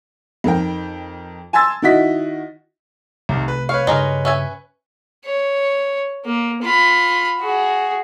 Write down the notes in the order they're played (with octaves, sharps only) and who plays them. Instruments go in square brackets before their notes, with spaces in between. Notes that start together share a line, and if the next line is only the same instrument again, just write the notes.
[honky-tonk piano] F2 D#4 A#4 G5
G#5 A5 C6 E6 A6
D#3 E4 F#4 D#5 B6
[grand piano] C2 D#3 [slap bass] C3 A3
[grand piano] B4
[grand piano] B4 C#5 C#6 [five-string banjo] F5
[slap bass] G2 C#3 [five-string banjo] G#3 D#4 A#4
[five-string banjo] C#4 E5 G#5
[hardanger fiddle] C#5
A#3
F4 B5
F#4 G#4